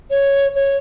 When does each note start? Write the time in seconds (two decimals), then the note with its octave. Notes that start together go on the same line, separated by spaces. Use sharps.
0.11 C#5
0.55 C#5